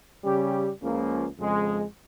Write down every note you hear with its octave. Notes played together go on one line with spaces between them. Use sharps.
C#3 G3 C#4 G4
C#2 C#3 F3 A#3
F2 C#3 G#3